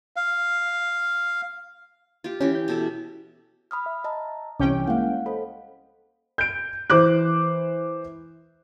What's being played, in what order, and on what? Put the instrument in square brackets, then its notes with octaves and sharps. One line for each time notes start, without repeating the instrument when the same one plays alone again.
[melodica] F5
[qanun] F4 G4
[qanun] E3 G4 [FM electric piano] C#4
[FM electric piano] G6
[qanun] B2 A4 E5
[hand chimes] B5 D#6 F6
[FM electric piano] E5
[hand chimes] D#5 A5 A#5
[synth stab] C2 C#4 G5 [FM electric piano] C3 E3 [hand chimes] D6
[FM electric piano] G#3 A#3 E4 [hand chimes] F5 F#5
[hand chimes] A4 C5 D#5 [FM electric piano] B5
[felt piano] G6 D7
E3 C5 D6 F#6